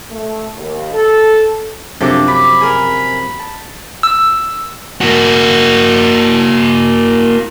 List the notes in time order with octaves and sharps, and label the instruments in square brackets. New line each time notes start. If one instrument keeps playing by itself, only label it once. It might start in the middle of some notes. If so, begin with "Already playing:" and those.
[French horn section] A3
D#2
A4
[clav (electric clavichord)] F#2 C3 F3 [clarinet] D4 [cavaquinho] A4 C#5 D6
[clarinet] B5 [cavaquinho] D6
[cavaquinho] G#4 A#4
A5
[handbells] E6
[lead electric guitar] A#3 F#4